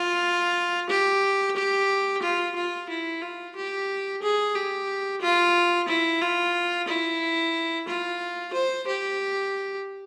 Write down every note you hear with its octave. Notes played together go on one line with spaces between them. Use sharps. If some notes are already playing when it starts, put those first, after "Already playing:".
Already playing: F4
G4
G4
F4
F4
E4
F4
G4
G#4
G4
F4
E4
F4
E4
F4
C5
G4